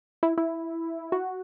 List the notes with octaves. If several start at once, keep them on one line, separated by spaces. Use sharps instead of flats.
E4
E4
F#4